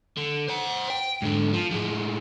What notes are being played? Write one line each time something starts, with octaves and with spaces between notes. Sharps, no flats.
D3
C5 F#5
G5
G#2 D3
F3
A2 G#3